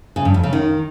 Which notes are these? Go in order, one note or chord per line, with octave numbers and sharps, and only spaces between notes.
C#3
G2
F2
C#3
D#3